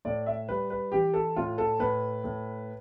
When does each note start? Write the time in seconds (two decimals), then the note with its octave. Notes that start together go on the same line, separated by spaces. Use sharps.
0.05 A2 D5
0.26 E5
0.48 G3 B4
0.70 B4
0.92 E3 G4
1.14 A4
1.36 A2 F4
1.58 A4
1.79 A2 B4
2.24 A2